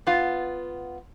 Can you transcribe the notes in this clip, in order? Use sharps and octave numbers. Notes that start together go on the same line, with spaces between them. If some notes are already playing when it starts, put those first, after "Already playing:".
B3 F4